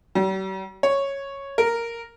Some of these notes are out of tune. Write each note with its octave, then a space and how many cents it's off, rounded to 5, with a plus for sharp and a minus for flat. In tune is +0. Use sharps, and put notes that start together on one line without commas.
G3 -45
C#5 -5
A#4 -5